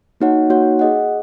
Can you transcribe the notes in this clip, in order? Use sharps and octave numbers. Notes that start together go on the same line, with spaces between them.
A#3 D#4 F#4 C#5 F#5
A#3 D#4 F#4 C#5 F#5
G#4 D#5 F#5